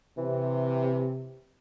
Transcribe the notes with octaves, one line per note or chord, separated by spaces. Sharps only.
C3 E3